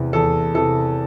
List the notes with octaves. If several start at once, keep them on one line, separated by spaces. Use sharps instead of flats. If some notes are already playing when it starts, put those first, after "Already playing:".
Already playing: E2 C3 E3
E2 A4
C3 E3 A4